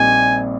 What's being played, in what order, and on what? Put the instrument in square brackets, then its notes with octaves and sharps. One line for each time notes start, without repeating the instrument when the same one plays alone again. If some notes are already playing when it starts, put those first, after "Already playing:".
Already playing: [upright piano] A#1 A#2 G3 C4 D#4 [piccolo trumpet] G#5